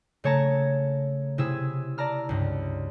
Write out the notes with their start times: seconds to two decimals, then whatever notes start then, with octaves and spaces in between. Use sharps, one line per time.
0.24 C#3 A3 C#5 A5 A#5
1.38 C3 E4 G#4 E6
1.98 D5 A5 A#5 F6
2.29 C#2 G2